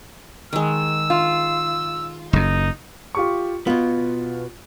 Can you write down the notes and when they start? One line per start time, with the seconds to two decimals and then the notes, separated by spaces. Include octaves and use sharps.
0.53 D#3 G#3 E6
1.10 F4
2.33 F#1 F#2 D#4
3.15 F4 G4 C#6
3.67 B2 B3 F4